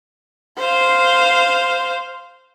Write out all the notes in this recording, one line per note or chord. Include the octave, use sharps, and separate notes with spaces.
C5 F5